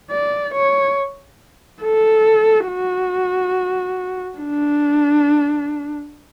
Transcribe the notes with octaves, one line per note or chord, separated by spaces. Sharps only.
D5
C#5
A4
F#4
D4